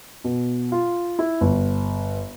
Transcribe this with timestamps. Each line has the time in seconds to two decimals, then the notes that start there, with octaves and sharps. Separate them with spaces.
0.24 B2
0.72 F4
1.19 E4
1.41 G1